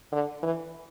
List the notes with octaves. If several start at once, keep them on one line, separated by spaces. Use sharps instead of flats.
D3
E3